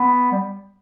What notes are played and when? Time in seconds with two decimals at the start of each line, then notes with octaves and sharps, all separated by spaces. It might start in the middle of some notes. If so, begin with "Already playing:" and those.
Already playing: B3
0.32 G3